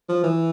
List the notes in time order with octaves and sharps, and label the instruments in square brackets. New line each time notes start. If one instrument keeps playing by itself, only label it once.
[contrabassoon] F3
E3